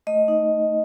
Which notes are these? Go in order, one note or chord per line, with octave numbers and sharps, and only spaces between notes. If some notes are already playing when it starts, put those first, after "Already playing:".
A3 D#5
D#4